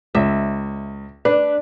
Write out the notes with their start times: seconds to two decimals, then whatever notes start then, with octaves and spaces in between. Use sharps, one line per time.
0.15 C#2 E5
1.25 D4 B4